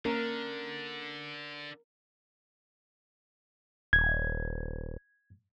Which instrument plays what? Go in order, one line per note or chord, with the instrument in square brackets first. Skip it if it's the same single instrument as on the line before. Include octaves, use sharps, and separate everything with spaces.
[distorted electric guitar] D3 [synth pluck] A#3 C#4 [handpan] A#4
[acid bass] D#1 [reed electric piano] G#6